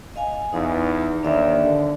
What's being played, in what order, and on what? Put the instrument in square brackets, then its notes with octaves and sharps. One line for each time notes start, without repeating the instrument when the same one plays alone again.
[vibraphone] D#5 F5 G#5
[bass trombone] E2 [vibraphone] D#4
[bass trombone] D#2 [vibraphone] D4 D5 E5
[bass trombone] D3